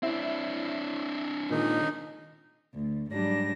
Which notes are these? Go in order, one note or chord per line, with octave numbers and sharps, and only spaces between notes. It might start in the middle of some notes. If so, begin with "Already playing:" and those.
C4 D4 E4
A#2 D#3 G#3 D#4
D2
G#2 F#3 G3 D4 A#6